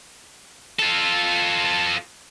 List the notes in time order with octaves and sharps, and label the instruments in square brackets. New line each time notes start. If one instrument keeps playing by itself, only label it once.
[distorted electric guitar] F4 A4